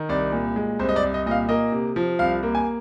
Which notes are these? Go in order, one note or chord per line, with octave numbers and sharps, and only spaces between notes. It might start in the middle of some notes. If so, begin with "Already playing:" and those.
Already playing: D#3
C2 D5
A#2
G#3
C2 C5
D#5
D5
C2
D#5
A#2 D#5
F5
A#3 D#5
C3
F3
C2 F5
A#3
G#5